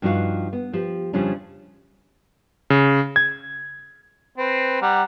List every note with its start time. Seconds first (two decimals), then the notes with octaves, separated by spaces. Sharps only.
0.02 G2 F3 B3 D#4 F#4 F5
0.53 B3
0.73 F3 G4
1.13 F2 C#3 F3 G3 C#4 D4
2.70 C#3
3.16 G#6
4.38 C4 B4
4.82 G3 F#5 A#5